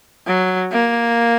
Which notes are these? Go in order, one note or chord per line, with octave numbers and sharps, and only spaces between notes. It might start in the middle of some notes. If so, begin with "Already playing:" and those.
F#3
A#3